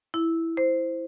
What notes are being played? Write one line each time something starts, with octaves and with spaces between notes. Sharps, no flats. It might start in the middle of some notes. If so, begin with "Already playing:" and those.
E4
C5